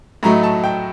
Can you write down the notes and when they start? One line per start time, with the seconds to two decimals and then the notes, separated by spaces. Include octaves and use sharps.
0.23 A2 F#3 A3 D#4 A#5
0.43 A5
0.64 G5